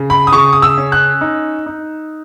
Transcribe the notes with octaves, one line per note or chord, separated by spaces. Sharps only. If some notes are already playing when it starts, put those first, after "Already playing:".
Already playing: C#3
B5
D#6
C#3 C#6
D#6
E6
C#4
F#6
D#4
D#4